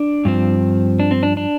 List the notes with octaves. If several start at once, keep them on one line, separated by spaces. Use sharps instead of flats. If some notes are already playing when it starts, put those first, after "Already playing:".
Already playing: D4
G2 F3 C4
D4
C4
D4
D4